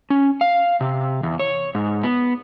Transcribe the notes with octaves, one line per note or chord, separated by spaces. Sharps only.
C#4
F5
C3
E2
C#5
G#2
B3